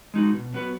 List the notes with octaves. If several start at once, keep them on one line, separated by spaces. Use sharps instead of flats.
G#3 D#4 F#4
B2
F#3 B3 F#4 B4